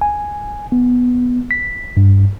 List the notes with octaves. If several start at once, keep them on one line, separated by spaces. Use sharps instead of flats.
G#5
B3
B6
G2